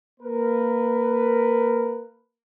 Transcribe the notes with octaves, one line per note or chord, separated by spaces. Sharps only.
A#3 A#4 B4